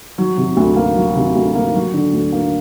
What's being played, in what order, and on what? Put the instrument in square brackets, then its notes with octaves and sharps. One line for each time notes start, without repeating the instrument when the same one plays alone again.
[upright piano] F#3
C3
D2
A#3
F#3
C3
D2
A#3
F#3
D3
D2
A#3